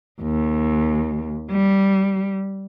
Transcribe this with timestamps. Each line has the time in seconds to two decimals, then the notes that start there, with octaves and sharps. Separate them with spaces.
0.21 D#2
1.50 G3